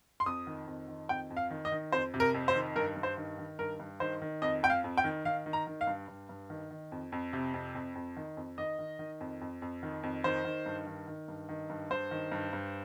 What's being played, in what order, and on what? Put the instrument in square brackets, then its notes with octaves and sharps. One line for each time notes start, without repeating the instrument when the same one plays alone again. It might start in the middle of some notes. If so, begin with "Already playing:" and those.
[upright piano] C6
F2 D#6
D#3
F2
D#3
F2 G5
F2
F5
D#3
D#5
D#3
F2 C5
C3
A#4
F2
C5
D#3
G2 A#4
G2
C5
D#3
D#3
G2 A#4
G2
D#3 C5
D#3
F2 D#5
F2 G5
F5
F2
G5
D#3
D#3 F5
D#3
A#5
D#3
F5
G2
G2
G2
D#3
D#3
F2
F2
C3
F2
F2
F2
D#3
F2
D#3 D#5
D#3
D#3
F2
F2
F2
D#3
F2
D#3 C5
D#3
G2
D#3
D#3
G2
D#3
G2
G2 C5
D#3
G2
G2